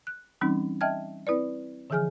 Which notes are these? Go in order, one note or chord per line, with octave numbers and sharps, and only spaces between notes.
F#6
E3 G3 C4 C#4 D#4
D#5 E5 G5 A5 F6 G#6
C4 E4 B4 D5
D3 E3 F3 G#4 G#5 F6